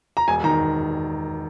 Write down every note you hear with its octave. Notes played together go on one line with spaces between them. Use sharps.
A#5
E1 G#5
D#3 A#5